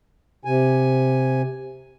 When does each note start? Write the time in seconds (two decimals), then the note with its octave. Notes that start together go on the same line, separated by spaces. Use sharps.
0.45 C3 G#5